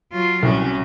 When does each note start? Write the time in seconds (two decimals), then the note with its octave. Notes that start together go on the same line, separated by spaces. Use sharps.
0.12 F#3 F4
0.43 C2 F#3 C#4